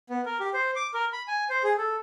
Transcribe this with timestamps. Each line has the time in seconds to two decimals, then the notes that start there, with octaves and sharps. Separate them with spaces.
0.10 B3
0.26 A#4
0.40 G4
0.54 C5
0.76 D6
0.94 A#4
1.13 B5
1.28 G#5
1.50 C5
1.64 G#4
1.78 A4